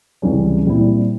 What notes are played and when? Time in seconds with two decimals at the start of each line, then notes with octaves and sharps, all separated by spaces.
0.22 C#2 C3 E3 G3 C#4
0.66 A#2 G3 C4 E4